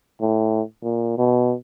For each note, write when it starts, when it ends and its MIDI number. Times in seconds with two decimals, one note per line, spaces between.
0.21 0.62 45
0.83 1.15 46
1.18 1.55 47